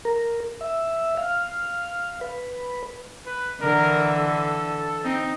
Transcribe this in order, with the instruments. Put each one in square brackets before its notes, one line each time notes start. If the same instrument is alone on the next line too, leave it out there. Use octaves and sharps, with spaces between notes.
[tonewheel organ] A#4
E5
F5
B4
[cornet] B4
[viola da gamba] D3 E3 [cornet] A#4
[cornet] A4
[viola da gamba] C4 [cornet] D#4